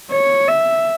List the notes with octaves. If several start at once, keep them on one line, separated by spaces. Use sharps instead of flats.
C#5
E5